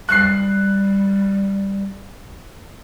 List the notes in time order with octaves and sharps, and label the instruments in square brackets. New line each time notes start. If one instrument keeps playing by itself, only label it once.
[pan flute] G3 [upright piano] F#6 C7